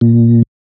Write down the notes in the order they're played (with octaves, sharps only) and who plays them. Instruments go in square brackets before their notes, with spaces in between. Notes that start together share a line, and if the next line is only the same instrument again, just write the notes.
[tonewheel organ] A#2